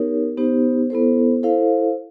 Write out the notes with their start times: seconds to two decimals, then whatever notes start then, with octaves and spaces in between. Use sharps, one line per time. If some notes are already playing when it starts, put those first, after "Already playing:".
Already playing: B3 D#4 G4 A#4 C#5
0.37 B3 D#4 G4 C5
0.90 B3 E4 A4 C5
1.43 E4 A4 C5 F5